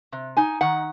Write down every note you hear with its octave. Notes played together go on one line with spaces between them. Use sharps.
C3
D#4 G#5
D#3 F#5